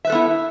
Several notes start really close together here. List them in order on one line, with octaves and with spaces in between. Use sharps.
E5 B4 A4 B3 E4